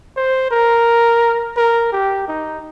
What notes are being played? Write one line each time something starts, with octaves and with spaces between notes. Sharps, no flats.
C5
A#4
A#4
G4
D#4